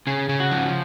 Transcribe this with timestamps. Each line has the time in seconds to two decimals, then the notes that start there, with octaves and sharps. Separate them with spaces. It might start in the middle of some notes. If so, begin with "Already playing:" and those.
0.07 C#3 G#4
0.29 C#3
0.40 F#4
0.51 F3